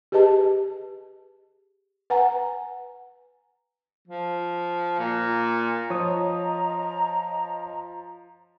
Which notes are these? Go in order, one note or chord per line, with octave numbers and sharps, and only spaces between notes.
G4 G#4 B4 D#5 A5
B4 F#5 G#5 A#5
F3
A#2
F3 C#5 D#5 A#5 D#6